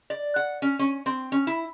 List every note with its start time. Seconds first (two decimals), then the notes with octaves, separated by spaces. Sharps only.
0.10 D5
0.36 F#5
0.62 C#4
0.79 C#4
1.06 C4
1.32 C#4
1.47 E4